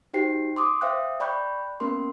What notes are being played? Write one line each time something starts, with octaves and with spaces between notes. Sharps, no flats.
D#4 F#4 G4 C5 G5 C7
C6 D6 D#6
C5 E5 F5 G5 D#6 F#6
D5 G5 B5 C#6 F#6 G6
A#3 B3 C#4 A#4 C6